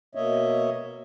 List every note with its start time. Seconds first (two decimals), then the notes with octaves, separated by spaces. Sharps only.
0.15 B2 A#3 C#5 D#5 E5